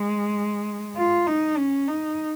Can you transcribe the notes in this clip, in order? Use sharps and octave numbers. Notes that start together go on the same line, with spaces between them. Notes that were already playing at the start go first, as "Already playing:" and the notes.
Already playing: G#3
F4
D#4
C#4
D#4